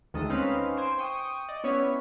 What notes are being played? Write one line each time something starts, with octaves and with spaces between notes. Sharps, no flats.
D2 D#3 G#3 A4 D#6
C4 C#4 D#4 B4 C5 F5
C5 G#5 C6 D7 E7
G5 C#6 D#6 D#7
D5 D#5
B3 C#4 E4 C#5